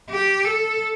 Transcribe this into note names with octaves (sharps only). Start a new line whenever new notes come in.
G4
A4